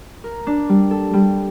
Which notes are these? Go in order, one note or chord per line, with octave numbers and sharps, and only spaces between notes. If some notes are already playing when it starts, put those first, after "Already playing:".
A#4
D4
G3
A4
G3